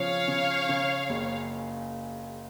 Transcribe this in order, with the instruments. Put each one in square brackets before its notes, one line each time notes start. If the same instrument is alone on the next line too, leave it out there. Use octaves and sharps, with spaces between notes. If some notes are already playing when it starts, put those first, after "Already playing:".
Already playing: [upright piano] C#3 F3 [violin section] C#5 F5
[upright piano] C#3
C#3
F#1